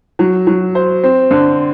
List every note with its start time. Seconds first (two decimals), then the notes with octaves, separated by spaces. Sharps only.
0.19 F#3
0.47 F#3
0.75 C5
1.04 C4
1.31 D3